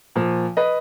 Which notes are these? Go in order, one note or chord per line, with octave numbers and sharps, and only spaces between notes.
A#2 F3
B4 D#5